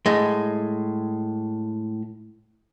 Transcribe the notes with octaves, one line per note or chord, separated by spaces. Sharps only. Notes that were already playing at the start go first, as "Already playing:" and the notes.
A2 G#3